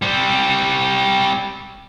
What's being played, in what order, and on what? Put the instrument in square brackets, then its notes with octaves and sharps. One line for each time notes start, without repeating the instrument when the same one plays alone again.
[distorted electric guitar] G3 C4